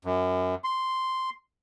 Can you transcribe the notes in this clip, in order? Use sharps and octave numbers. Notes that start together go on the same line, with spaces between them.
F#2
C6